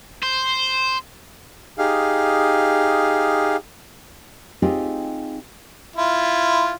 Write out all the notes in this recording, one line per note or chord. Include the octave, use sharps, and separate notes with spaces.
C5
D#4 G4 G#4 F5
C4 D#4 F4 G4 G#4
E4 F4